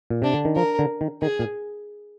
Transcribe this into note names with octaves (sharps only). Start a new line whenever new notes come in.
A#2
C3 D4
D3
D#3
F3 A#4
D3
D#3
D#3 G#4
A#2